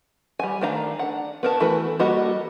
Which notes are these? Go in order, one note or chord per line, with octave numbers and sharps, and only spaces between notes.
G3 G#5
D#3 A3 D4 F5 A#5
D4 F#5
B3 A#4 A5
E3 A3 E4 F#4 B4
G3 A#3 F#4 A4 D#5